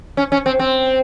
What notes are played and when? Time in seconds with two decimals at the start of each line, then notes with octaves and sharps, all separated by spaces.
0.17 C#4
0.32 C#4
0.46 C4
0.59 C4